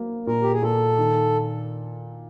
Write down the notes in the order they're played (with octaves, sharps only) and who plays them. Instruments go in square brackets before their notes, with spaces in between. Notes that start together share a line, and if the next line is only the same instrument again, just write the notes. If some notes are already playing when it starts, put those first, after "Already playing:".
Already playing: [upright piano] F#3 A#3
[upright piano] A#2 [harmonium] A#4
[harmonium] G4
G#4
[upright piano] A#2 [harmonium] A4
[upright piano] D#3